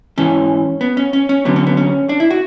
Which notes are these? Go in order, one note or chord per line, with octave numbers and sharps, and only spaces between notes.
G#2 E3 C#4
B3
C#4
C#4
C#4
D2 D3 F#3 B3
C#4
B3
C#4
D4
E4
F#4